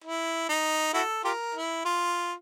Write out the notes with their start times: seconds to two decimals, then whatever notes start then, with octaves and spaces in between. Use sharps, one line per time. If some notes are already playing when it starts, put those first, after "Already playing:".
0.04 E4
0.49 D#4
0.94 E4 F#4 A4
1.24 F4 G4 A#4
1.55 E4
1.85 F4